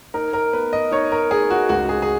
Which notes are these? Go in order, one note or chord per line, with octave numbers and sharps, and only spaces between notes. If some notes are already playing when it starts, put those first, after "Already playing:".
D#4 A#4
A#4
B3 B4
D#5
D#4 C#5
A#4
D#4 G#4
F#4
C#2 F#4
G#4
G#4